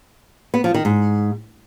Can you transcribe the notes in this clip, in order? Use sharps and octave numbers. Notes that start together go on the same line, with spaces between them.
B3
F3
D#3
G#2